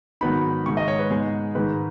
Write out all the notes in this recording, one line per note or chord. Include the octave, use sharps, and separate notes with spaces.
G#2 D#3 F#3 B3 D#4 B5
G#2 D#3 G#3 C#6
D#5
C#5
B4
G#2 G#3 B3 D#4 G#4
G#2 D#3 G#3 D#4 B4